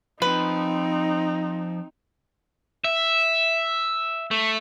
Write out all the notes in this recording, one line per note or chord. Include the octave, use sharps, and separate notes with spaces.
F3 C4 D#4 B4
E5
A3